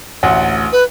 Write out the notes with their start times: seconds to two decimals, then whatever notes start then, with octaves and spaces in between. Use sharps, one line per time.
0.23 A1 D2 F#5
0.72 B4